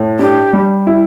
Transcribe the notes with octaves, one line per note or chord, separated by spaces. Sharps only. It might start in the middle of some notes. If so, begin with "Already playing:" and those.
Already playing: A2
D4 G4
G3
E4